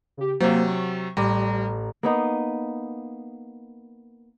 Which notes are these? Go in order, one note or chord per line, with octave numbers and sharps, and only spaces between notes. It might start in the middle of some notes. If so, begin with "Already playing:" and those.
C#3 G4
C3 F#3 A#3 C5
C#6
A1 G3 A#5 D6
A#3 B3 D#4